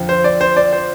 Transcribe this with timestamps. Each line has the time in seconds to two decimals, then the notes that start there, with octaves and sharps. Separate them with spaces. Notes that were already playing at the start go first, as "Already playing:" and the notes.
Already playing: F2 D3 F3
0.09 C5
0.24 D5
0.41 C5
0.57 D5
0.73 C5